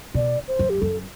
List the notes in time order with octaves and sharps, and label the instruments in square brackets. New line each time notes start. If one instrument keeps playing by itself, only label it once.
[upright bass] B2 [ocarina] D5
[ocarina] C5
[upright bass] F#2
[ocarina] G4
[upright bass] F#2 [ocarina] A4